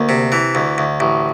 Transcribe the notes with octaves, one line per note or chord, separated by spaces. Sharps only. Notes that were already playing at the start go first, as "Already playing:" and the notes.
Already playing: D2 A#3
C3
E3
D2
D2
A1